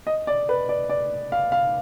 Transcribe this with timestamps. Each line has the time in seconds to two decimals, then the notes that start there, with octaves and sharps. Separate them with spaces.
0.07 D#5
0.27 D5
0.49 B4
0.69 D5
0.89 D5
1.32 F5
1.52 F5